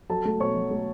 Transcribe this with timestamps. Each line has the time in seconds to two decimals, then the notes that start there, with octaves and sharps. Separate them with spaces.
0.10 F#3 A4 A5
0.25 A3
0.40 B2 C#5 C#6
0.56 F#3
0.71 A3